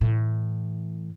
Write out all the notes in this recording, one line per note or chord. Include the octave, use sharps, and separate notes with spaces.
A2 E3